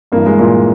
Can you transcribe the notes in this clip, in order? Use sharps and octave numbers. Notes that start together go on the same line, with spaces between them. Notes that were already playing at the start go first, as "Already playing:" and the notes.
G2 E3 A#3
G#3
A#2 A#3